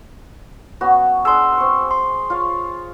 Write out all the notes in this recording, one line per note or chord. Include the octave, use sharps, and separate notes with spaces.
B3 C#4 F#4
D4 G#4 C6 E6
C4 C#6
C6
F4 C#5 F5